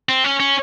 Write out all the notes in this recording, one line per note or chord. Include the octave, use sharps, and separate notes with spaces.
C4
C#4
C#4